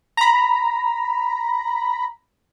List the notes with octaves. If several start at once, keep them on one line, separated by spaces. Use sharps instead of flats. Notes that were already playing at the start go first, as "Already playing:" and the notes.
A#5 B5